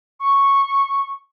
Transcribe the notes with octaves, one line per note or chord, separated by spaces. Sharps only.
C#6